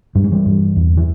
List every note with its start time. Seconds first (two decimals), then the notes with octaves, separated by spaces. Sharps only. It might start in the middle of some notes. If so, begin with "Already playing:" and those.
0.15 G2 G3
0.24 G#3
0.32 E3 G3
0.46 G2
0.76 E2
0.97 E3